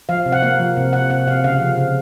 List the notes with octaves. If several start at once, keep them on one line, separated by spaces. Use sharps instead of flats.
F3 F5
C3
F#5
A#3 F5
F3
C3
C3 F#5
C3 F#5
C3 F5
C#3 F5
F3
C#3